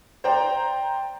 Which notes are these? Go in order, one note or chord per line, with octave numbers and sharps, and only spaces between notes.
C5 D5 G5 A#5